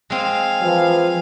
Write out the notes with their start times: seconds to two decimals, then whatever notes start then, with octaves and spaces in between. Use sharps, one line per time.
0.10 G#3 C4 F5 G#5
0.62 E3 F3